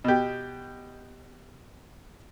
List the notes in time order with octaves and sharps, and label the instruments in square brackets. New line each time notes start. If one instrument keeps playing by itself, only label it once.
[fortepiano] B2 G4